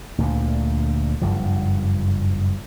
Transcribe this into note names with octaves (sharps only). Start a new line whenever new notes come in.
D2 A#2 D3
F#1 G2 F3